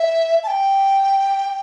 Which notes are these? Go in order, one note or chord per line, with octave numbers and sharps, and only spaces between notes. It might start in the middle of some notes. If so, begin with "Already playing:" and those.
Already playing: E5
A5
G5